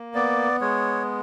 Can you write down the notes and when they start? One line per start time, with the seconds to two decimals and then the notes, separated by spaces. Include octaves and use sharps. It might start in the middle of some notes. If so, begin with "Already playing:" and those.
Already playing: A#3
0.14 B3 D5
0.61 G#3 C#5